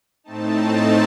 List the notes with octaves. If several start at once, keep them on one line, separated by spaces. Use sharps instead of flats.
A2 A3 C4 D#4 A5